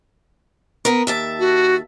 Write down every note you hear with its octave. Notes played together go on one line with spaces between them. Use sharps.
B3 A#4
D#2 E5 A5
F#4